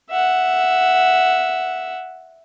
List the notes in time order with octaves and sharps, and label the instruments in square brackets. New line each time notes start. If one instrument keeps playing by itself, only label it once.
[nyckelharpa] E5 F#5